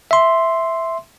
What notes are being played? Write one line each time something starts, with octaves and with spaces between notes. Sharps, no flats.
E5 C6